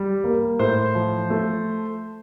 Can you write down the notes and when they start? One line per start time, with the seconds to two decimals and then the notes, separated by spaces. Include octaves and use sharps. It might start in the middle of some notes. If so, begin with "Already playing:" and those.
Already playing: G3
0.24 A#3
0.59 A2 C5
0.95 F3
1.30 A3